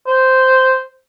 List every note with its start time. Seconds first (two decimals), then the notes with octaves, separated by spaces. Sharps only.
0.07 C5